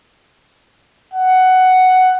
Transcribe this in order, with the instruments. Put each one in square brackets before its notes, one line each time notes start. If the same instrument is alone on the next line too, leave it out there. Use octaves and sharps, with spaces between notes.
[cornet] F#5